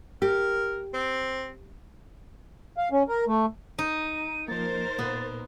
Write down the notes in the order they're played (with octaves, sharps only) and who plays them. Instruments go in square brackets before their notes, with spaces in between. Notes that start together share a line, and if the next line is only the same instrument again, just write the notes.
[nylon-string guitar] G4 [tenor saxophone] A#4
[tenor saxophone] C4
[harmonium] F5
C#4
A#4
A3
[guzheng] D#4 [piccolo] D#7
[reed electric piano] F3 A#3 [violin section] A#4 C5 [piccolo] A6
[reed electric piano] A#2 [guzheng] B3